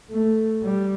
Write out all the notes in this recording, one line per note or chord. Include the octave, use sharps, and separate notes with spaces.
A3
G3